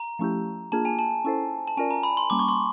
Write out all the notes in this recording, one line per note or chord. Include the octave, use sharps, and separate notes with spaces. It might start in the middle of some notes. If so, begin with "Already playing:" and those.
Already playing: A#5
F3 A3 C#4 E4 G4
A#3 D4 F4 G#4 A5
G#5
A5
C#4 E4 A4 C5
A5
C#4 F4 A#4 D5 G#5
A#5
B5
C6
G3 A#3 C#4 D6
C#6
C6